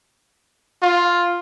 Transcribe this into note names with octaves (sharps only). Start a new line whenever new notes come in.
F4